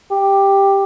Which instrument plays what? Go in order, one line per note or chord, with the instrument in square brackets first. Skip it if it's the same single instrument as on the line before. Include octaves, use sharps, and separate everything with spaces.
[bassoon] G4